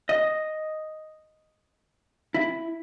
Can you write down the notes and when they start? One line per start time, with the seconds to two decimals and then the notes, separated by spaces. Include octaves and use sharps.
0.09 D#5
2.34 E4